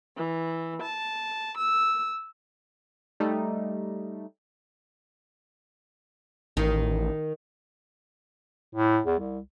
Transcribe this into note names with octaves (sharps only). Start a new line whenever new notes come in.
E3
A5
E6
G3 A3 D#4
A1 D#3
A2
E2
C2